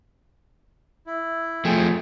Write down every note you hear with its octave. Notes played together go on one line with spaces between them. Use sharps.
E4
F3 A3 G#4 G5